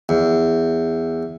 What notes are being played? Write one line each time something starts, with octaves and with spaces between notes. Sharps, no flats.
E2